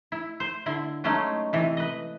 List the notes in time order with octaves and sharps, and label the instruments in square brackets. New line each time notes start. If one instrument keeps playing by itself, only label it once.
[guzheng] E4
C5
D3 E4 C6
F#3 G#3 A3 C#4 D#4
C3 E3
B4 D#5